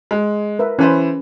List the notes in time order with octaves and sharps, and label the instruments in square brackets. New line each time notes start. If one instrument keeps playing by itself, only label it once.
[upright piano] G#3
[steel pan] A#4 B4 E5
[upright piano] E3 B4 C5 [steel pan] C#4 A5 B5